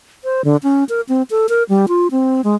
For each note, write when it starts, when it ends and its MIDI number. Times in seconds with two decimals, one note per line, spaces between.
0.24 0.42 72
0.45 0.57 50
0.63 0.84 61
0.89 1.01 70
1.09 1.22 60
1.31 1.47 69
1.49 1.63 70
1.69 1.86 55
1.88 2.07 65
2.11 2.41 60
2.44 2.55 56